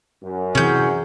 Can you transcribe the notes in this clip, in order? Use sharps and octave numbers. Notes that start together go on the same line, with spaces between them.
F#2
C3 E3 C#4 G#4 G6